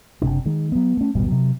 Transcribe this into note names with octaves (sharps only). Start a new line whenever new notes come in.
F#1 B1 C3 D4
D#3 G#3
F#3 B3
A3 C#4
D#1 G#1 B2 G3
C3 F#3